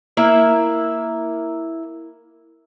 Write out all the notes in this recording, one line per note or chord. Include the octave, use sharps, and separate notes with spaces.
A#3 E4 E5